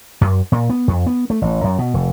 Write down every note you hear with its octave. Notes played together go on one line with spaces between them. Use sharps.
F#2
A#2
B3
F2
B3
A3
A1
F#2
B2
F1